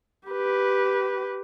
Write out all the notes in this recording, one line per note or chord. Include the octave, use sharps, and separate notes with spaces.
G4 B4